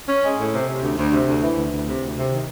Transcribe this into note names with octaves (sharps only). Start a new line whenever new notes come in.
C#4
G#3
A2
C3
C3
D2
D2
C3
D2
E3
D2
D2
C3
D2
C3
D#3